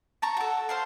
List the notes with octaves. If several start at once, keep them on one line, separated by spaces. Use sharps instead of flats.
A5 A#5 C#6
F#4 A4
C5 F5 C6